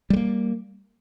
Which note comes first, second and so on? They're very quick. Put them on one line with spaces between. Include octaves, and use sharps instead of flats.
G3 G#3 A#3